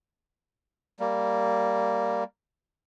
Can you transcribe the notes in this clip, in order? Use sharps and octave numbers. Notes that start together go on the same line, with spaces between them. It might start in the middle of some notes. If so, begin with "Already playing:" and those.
G3 A#3